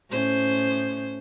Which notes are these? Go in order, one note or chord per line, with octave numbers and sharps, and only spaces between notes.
A2 C#4 C5